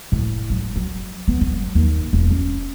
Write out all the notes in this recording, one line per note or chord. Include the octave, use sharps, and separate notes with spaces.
A2
F#3
F#3
B3
F#3
D#2
E1
C#4